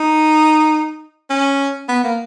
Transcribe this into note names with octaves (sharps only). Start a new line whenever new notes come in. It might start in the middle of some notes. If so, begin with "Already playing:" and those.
Already playing: D#4
C#4
B3
A#3